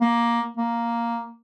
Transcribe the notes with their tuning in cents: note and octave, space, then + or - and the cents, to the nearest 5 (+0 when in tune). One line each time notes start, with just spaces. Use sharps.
A#3 +10
A#3 +0